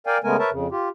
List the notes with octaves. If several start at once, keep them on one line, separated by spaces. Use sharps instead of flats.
A#4 D5 F5 G5 G#5
C#3 G#3 A3 B3 A#4 G#5
A#4 B4 C#5 E5 A5
F2 C#3
F4 G4